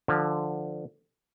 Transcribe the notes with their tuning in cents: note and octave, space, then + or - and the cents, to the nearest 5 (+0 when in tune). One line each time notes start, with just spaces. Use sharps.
D3 +15 F3 +0